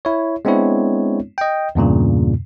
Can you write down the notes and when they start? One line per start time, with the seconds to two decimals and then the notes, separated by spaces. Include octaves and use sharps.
0.05 E4 C#5
0.45 G#3 B3 C4 D4 E4 C#5
1.38 D#5 G5
1.75 E2 G2 A#2 C#3